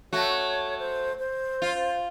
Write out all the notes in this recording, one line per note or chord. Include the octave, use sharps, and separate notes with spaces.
A3 F#4 C#5
C5
C5
F4